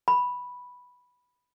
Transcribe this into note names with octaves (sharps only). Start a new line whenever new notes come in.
B5